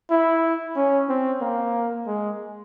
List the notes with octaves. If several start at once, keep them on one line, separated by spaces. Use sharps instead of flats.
E4
C#4
C4
A#3
G#3